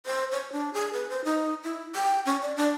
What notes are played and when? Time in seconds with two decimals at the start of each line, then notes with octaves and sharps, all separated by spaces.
0.06 C5
0.32 C#5
0.52 D4
0.74 G#4
0.93 B4
1.10 C5
1.25 D#4
1.64 E4
1.95 G5
2.26 C#4
2.42 D5
2.57 D4